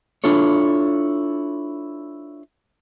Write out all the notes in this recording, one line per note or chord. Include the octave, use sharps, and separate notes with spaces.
D4 E4 F4 A4 C#5